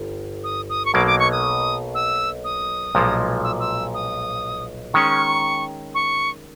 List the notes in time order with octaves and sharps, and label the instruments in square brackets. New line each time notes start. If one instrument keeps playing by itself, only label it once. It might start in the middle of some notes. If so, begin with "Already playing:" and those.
Already playing: [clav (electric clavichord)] G1
[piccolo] D#6
D#6
C#6
[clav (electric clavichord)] B1 B2 F#3 A#3 [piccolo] D6
[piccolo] D6
C#6
D#6
E6
D#6
[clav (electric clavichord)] B1 A#2 F3 G#3
[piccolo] E6
E6
D#6
[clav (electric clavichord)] D#3 G#3 C#4 [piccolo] C#6
[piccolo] C#6